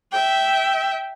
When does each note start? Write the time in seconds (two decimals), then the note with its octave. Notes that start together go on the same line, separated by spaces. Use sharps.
0.12 E5 G5